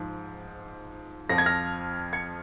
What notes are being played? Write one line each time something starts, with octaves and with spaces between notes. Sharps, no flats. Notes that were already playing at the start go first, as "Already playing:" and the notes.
Already playing: G#2 F3
F2 F3 A#6
G#6
F6 A#6
G#6 C#7